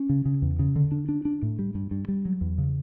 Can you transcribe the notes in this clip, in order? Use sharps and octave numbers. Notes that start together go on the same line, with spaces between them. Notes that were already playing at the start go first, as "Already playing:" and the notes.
Already playing: C#4
C#3
C#3
E2
C#3
D3
D4
D4
D4
A2
G3
G2
G2
G3
F#3
E2
C#3